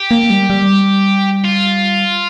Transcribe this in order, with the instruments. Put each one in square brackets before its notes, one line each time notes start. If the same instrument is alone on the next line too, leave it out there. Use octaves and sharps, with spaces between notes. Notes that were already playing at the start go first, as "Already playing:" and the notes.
Already playing: [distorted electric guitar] G4
[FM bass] A#3
G3
G3
[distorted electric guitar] F4